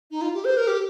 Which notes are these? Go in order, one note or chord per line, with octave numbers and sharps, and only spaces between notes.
D#4
F4
G4
C5
A#4
G4